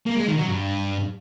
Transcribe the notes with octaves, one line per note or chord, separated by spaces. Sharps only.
A#3
G#3
D#3
F#3
G2